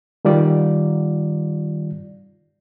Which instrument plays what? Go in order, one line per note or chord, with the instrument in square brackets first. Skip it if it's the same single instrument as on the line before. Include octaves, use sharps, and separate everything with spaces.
[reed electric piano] D#3 G3 F4 D5